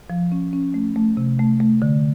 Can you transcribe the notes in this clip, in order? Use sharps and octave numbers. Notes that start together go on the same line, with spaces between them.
F3
C#4
C#4
A3
A3
C3
A3
A3
D3